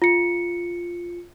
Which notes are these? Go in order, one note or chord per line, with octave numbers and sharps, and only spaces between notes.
F4 C#7